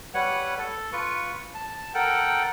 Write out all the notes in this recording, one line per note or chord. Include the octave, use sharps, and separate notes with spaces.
G3 B4 C#5 F#5
A4
F4 B4 C#6
A5
A4 A#4 F#5 G5